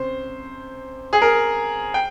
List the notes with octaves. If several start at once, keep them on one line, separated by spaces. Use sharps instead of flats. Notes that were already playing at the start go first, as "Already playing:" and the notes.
Already playing: C3 C#4 C5
G#4
A#4
G5